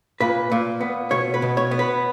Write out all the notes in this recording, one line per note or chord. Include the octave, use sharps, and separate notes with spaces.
A#2 B4
A#2
B3
B2 C#5
B4
B2
C#5
B3
B4